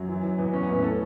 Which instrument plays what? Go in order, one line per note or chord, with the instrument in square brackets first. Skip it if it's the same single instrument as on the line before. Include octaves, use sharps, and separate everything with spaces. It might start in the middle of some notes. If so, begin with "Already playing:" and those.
Already playing: [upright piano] F#2 [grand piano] F#3
[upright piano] E3
E3
[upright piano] E2 [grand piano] B3
[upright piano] E2 [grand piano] C#4
[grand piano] B3
[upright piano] A2 [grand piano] C#4
[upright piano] A4